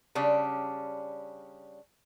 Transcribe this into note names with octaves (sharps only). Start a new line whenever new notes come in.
C#3 G3 C#4 D4